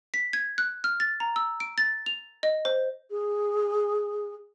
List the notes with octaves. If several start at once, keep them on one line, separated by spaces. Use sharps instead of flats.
B6
G#6
F#6
F6
A6
A#5
E6
D7
A6
F7
D#5
C5
G#4